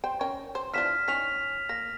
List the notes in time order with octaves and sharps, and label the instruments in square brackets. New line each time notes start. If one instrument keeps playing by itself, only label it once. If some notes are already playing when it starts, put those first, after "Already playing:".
[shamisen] C5 G5
C#4 A#4 G5
C5
[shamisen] E3 F3 D4 [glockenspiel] F6 B6 E7
[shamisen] D#3 C#4 [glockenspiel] B6 F7
[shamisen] A#3 [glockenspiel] A#6